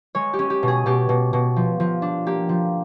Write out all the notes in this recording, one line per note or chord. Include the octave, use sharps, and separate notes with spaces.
G#3 C#5
G4
C#4
G4
B2
G#4
B2 G4
B2
B2
F3
F3
D4
A#3 G4
F3